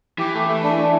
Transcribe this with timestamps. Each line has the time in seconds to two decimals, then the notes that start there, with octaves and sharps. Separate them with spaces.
0.18 E3 G4
0.34 A3
0.48 A3
0.63 D4
0.77 A3